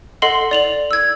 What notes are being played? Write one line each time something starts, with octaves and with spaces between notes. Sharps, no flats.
A4 D#5 F#5 C6 C7 F#7
D5 F7 F#7
E6 G#6